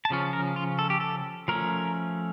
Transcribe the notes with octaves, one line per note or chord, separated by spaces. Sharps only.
A5
C#3 F3 C#4
A#4
F4
A4
G4
A4
F3 A3 C#4 A#4